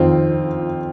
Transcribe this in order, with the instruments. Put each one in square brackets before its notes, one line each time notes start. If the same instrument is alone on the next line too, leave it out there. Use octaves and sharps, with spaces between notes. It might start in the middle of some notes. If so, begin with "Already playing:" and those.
Already playing: [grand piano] F2 D#3 C4 F4